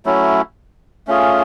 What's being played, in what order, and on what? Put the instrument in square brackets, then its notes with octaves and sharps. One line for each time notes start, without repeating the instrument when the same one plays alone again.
[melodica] F#3 A3 C#4 E4
A3 C#4 F4 G#4